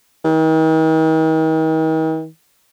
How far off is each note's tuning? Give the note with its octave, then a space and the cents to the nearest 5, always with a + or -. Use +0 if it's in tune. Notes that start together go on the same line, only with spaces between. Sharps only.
D#3 +40